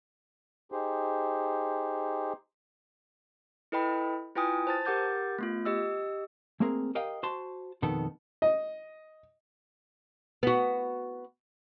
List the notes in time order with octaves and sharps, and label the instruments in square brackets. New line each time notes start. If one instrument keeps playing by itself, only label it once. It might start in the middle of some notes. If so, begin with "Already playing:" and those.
[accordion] D#4 G4 G#4 C5
[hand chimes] E4 A4 B4 D#5 G5 B5
E4 F4 B4 G5 G#5 D#6
C5 A5 A6
G4 A#4 F#5 D6 G6 A6
A3 B3 F4
G4 D#5 E6
[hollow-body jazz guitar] A3 A#3 C4 G#4 A#4
G4 A#4 D#5 F5 G5
F#4 C5 A5 C6
F2 B2 D#3 B3 A4
[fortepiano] D#5
[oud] B3 F#4